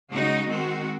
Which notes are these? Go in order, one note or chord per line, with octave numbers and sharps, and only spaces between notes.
C#3 G#3 D#4 F#4
D#3 G#3 C4 F#4